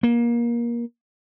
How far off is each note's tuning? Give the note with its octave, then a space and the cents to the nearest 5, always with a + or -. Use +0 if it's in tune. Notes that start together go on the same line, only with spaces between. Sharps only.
A#3 +25